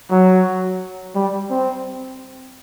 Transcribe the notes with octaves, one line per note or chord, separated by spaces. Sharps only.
F#3
G3
C4